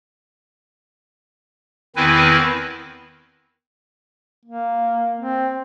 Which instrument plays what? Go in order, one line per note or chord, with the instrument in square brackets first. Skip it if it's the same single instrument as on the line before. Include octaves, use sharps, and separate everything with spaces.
[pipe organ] E2 D#3 C4 E4 B4 G#5
[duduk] A#3
C4